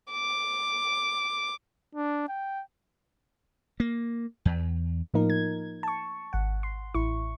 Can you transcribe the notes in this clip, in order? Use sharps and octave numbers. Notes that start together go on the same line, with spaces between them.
D6
D4
G5
A#3
E2
A2 F3 A#3 D#4 A#4
G#6
A5 C#6
G#1 F#5
C6
A1 E4 C#6